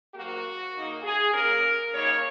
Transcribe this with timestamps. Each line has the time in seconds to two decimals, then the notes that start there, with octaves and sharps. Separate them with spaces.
0.14 G#2 F#3 A#3 F#4
0.73 C#3 A#3 D#4
1.03 G#4
1.33 C#3 A#3 C#4 A#4
1.92 F#2 C#3 A#3 D#4 C#5